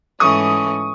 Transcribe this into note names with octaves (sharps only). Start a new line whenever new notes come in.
G#2 E3 A3 C#4 C#6 D#6